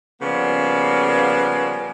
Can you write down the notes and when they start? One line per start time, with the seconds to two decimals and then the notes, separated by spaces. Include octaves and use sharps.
0.21 C#3 F3 G3 A#3 B3